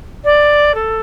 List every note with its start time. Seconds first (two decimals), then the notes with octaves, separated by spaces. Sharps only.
0.24 D5
0.74 A4